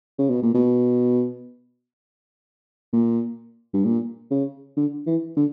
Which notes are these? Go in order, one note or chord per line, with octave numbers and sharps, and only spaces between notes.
C#3
B2
A#2
B2
A#2
G2
A#2
C#3
D3
E3
D3